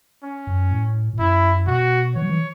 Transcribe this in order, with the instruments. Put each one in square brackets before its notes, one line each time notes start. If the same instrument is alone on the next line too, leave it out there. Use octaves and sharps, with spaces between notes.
[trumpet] C#4
[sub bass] F#2
A2
A2
[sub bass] F#2 [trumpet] E4
[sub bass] B2 [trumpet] F#4
[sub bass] E3 [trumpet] C#5
[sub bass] F#3
E3